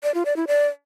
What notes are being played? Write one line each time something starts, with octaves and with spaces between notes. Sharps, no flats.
D5
F4
D5
E4
D5